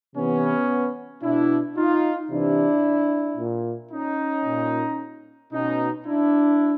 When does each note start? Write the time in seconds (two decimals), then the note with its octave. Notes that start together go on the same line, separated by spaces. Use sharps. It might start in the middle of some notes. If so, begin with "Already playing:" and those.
0.16 C3 E3 B3 C#4
1.23 B2 D4 E4
1.77 D#4 F4
2.30 C3 E3 D4 E4
3.38 A#2
3.92 C#4 D#4
4.45 A#2
5.52 B2 C#4 D#4
6.06 D4 E4